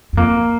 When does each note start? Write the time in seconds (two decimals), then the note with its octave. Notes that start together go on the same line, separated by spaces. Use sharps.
0.13 F#2
0.17 F2 A#3